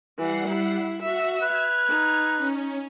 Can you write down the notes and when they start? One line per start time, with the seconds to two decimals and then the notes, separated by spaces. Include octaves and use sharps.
0.18 E3 G3 F#5 C7
0.48 E4
1.03 F#4 E5
1.41 B4 F6 G#6
1.88 D#4
2.36 C#4